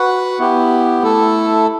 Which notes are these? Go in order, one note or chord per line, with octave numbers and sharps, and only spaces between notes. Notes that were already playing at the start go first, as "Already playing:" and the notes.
Already playing: F#4 B4 F#5
B3 E4 G4
A3 E4 A4